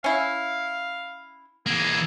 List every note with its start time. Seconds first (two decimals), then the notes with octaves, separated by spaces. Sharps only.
0.04 C#4 E4 F5
1.66 E3 A#3 G#4